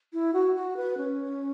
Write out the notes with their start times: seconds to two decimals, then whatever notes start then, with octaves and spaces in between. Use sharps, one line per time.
0.13 E4
0.33 F#4
0.55 F#4
0.77 B4
0.97 C#4